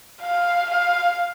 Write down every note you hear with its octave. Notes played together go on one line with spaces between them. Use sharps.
F5
F5